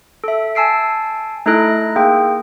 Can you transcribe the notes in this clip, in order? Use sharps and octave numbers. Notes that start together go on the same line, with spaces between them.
A4 E5
G#5 A5 E6 C7 D7
A3 D#4 E4 A4 F#6 A#6
A#3 G#4 G5